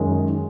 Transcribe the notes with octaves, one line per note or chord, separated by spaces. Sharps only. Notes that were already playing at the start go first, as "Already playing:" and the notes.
Already playing: F#2 D#3 G#3